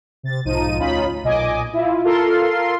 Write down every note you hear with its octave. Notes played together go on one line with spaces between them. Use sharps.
C3 A6
B1 G#2 F3 D#4 D#7
D2 C#4 D#4 F4 B5
B1 A#2 D#5 G#5 D6
E4 F4
F4 A4 A#4 C6